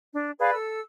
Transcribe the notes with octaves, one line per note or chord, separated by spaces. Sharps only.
D4
G#4 B4 D5 F5
A4 E6